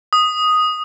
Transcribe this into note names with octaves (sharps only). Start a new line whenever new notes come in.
D#6